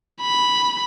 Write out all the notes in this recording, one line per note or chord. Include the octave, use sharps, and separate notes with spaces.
B5